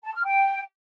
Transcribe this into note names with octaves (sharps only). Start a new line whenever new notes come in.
A5
F6
G5